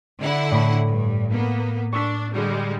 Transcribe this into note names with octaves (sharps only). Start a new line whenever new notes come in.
D3 E4 F#5
A2 B5
G2
A#3 B3
D4 C#6 E6 B6
D3 G3 G#3